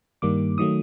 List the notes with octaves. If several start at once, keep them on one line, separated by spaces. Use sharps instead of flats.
G2 D#3 G3 A#3 D6
D#3 F#3 A3 D#6